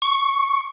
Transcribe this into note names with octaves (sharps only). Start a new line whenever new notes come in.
C#6